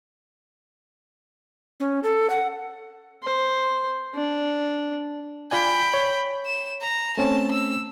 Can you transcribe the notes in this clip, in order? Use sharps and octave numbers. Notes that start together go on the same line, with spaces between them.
C#4
A4
F#5
C5
D4
F4 D5 G5 G#5 B5
C#5
E7
A#5
A3 C4 C#4 A5
E6